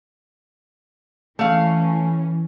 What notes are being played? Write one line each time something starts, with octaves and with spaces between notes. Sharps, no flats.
E3 A3 C#4 F5